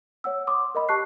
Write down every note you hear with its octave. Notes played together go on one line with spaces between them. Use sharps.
C#5 F#5 E6
C6 D6 D#6
A#4 D#5 B5
G4 A5 C#6 F#6 C7